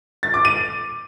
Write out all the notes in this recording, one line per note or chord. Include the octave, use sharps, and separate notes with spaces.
A6
D6
D#7